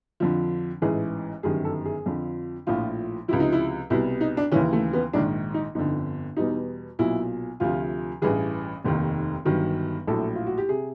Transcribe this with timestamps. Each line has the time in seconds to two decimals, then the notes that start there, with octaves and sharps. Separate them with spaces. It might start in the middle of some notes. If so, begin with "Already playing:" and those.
0.20 F2 D3 F3
0.82 A1 G#2 E3 G#4
1.43 G1 F#2 D#3 G3 G#4
1.65 A4
1.85 G#4
2.06 F2 D3 F3
2.67 A#1 A2 F3 F4
3.28 C#2 C3 F3 E4
3.40 D#4
3.53 E4
3.90 C2 B2 G3 E4
4.21 D#4
4.37 D4
4.52 D#2 C#3 E3 C#4
4.73 A3
4.93 B3
5.13 A#1 G#2 D#3 D4
5.54 D#4
5.75 G1 F2 D3 D#4
6.37 E2 B2 G3 D#4
6.99 B1 A#2 F#3 E4
7.60 D2 C3 F3 F4
8.22 A1 G2 E3 G#4
8.84 F1 D#2 D#3
9.45 G1 G2 D#3 F#3
10.07 A#1 A2 F#3 A4
10.35 F4
10.46 F#4
10.58 G4
10.69 C3 G#4